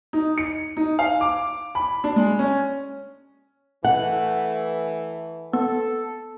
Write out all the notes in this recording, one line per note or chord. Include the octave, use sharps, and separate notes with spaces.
D#4
C#7
D#4
F5
D6
B5
D4
G#3
C#4
E3 A3 F#5
B3 A4